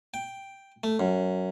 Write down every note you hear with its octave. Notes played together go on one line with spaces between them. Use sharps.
G5
A3
F#2